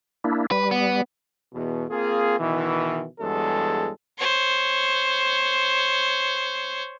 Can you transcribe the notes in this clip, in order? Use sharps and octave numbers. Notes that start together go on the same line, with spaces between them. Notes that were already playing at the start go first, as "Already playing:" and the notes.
A#3 D4 E4
G3 B4
B3
E2 B2
A#3 C4 F4 G#4
B2 D#3 E3
E2 G2 F#3 G#3 A4
C5 C#5